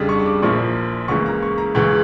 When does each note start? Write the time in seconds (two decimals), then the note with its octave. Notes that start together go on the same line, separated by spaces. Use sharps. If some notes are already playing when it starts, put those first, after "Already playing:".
Already playing: F2 C#3 G3 D4
0.09 C#6
0.19 C#6
0.26 D6
0.42 A#1 A#2 F3 A#3 E4 C#6
1.08 C#2 C#3 E3 A#3 C#6
1.26 A#5
1.42 C#6
1.58 A#5
1.75 C#2 C#3 E3 C#6